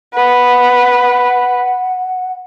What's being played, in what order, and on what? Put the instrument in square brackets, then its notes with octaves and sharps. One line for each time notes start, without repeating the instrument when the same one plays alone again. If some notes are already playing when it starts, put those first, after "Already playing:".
[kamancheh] B4 [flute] F#5